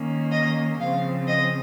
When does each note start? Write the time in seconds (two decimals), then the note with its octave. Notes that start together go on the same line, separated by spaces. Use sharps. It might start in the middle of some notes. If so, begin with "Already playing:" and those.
Already playing: D#3 A#3 C#4
0.31 D#5
0.79 C#3 F3 C4 F5
1.27 D#5